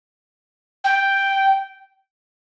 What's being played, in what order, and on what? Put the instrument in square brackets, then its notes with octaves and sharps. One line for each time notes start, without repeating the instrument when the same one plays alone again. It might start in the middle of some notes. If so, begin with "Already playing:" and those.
[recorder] G5